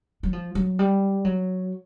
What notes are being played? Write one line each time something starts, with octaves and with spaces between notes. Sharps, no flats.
F#3
F3
F#3
G3
F#3